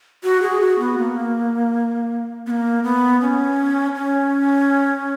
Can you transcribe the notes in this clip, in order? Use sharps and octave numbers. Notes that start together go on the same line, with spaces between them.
F#4
G#4
F#4
B3
A#3
B3
A#3
B3
C#4
C#4